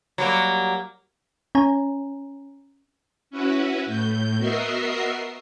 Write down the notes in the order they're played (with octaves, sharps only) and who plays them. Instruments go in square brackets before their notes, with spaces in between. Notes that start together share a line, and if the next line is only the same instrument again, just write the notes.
[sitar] F#3 G3 A#3
[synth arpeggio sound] C#4 C#5 G#5 A#5
[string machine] C#4 E4 F#4 B4
A2 G6
B3 F#4 A#4 D#5 E5 C7